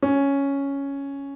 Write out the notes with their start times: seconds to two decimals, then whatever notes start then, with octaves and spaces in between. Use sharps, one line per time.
0.02 C#4